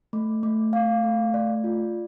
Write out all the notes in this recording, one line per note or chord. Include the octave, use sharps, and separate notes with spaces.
A3
A3
F5
A3
D5
F4